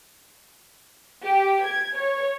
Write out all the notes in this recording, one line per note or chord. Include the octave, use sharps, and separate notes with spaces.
G4
G#6
C#5